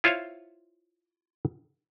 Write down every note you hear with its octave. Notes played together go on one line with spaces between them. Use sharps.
E4 F4 C5 C#5 E5 F5